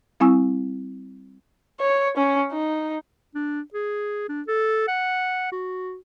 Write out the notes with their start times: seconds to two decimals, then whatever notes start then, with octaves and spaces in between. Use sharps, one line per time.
0.20 G3 C4 E4 G#5 C#6 E6
1.80 C#5
2.17 C#4
2.52 D#4
3.35 D4
3.74 G#4
4.29 D4
4.47 A4
4.88 F#5
5.52 F#4